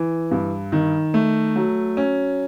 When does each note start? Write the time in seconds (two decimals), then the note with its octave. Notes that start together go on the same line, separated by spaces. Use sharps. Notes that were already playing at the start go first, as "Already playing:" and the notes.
Already playing: E3
0.31 G2
0.72 D#3
1.14 A3
1.56 F#3
1.97 C#4